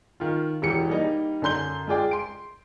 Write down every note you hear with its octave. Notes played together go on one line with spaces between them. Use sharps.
D#3 F4
E1 E3 G4 C#7
G3 A#3 D#4
F#2 D3 C6 G6 G7
G#3 F4 G#4 D5 G5
C6 D7